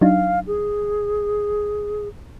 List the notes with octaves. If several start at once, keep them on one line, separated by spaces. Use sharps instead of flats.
F#3 D4 D#4 F5
G#4